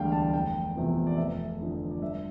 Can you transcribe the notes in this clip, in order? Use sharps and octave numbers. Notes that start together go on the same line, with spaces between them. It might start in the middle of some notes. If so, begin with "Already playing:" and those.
Already playing: E1 D2 D3 G3 F5 G5
A5
F1 G5
E2 C3 F3 B3
D5
F1 E5
F2 D3 F3
D5
G2 E5